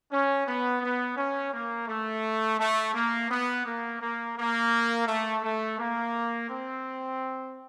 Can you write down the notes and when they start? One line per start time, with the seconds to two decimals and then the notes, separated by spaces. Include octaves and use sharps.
0.11 C#4
0.47 B3
0.82 B3
1.16 C#4
1.52 A#3
1.88 A3
2.59 A3
2.94 A#3
3.30 B3
3.65 A#3
4.00 A#3
4.36 A#3
5.07 A3
5.42 A3
5.78 A#3
6.48 C4